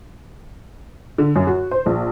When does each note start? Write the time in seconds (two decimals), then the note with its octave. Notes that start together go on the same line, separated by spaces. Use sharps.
1.18 D3
1.36 F#2
1.47 F#4
1.71 C5
1.86 A#1